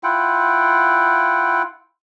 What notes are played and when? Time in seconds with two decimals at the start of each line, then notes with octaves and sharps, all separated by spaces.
0.03 E4 F4 F#5 G5